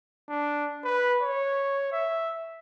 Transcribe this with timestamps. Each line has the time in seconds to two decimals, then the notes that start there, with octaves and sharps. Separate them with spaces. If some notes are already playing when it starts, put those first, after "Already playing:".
0.29 D4
0.84 B4
1.21 C#5
1.92 E5